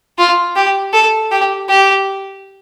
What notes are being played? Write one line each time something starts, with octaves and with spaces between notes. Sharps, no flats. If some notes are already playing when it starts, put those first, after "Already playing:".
F4
G4
A4
G4
G4